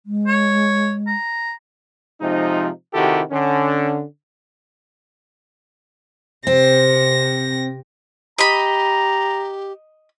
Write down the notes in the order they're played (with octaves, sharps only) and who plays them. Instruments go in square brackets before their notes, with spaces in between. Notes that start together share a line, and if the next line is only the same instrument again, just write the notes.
[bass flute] G#3
[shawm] C#5
A#5
[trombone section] C3 F3 G#3 D#4
C3 D#3 E4 F#4 G4 A4
D3 C#4
[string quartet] C3 A#6 [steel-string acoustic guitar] C4
[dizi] G4 [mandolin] D#5 B5 [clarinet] A#5